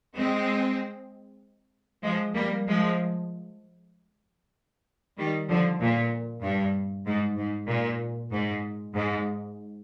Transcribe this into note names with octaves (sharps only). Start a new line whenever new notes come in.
G#3 C4
F3 G#3
G3 A#3
F3 G#3
D#3 G3
D3 F3
A#2
G2
G#2
G#2
A#2
G#2
G#2